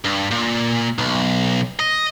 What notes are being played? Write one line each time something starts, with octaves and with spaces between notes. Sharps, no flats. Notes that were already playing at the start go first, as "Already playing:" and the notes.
G2
A#2
B1
D#5